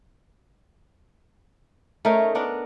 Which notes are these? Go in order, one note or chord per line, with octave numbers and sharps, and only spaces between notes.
A3 C#4 D#4 A#4
B3 D4 A#4